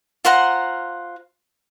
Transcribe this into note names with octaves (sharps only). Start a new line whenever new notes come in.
F4 C5 F#5 A#5